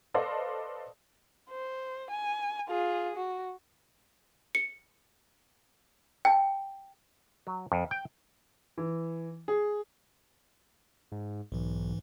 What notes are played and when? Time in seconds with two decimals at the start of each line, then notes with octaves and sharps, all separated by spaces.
0.14 A4 B4 C5 D5 D#5 F5
1.50 C5
2.11 G#5
2.69 F4 G#4
3.16 F#4
4.55 C#7
6.25 G5 A5
7.47 F#3
7.72 F2
7.91 G5
8.78 E3
9.48 G#4
11.12 G#2
11.52 B1 G#2 E3